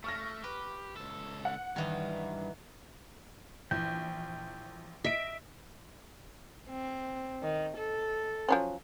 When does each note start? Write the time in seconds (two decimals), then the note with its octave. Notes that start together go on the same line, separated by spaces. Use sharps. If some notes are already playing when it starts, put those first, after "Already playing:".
0.04 A3 C#6 F6 A#6
0.44 G4 B4
0.96 C#2 A4
1.45 F#5
1.76 G2 D#3 E3 D#4
3.71 A#1 E3 G5
5.04 D#5 E5 A#6 B6 D7
6.70 C4
7.43 D#3
7.77 A4
8.49 F3 F#3 C#4